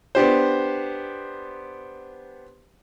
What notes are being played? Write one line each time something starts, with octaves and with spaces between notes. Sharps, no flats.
B3 D4 G4 C5